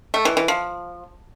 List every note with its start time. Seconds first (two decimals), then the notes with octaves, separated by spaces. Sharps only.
0.14 A3
0.25 E3
0.37 E3
0.48 F3